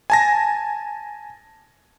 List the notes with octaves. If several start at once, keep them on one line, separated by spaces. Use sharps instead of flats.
G#5 A5 A#6